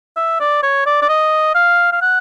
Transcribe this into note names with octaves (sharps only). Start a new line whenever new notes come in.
E5
D5
C#5
D5
D5
D#5
F5
F5
F#5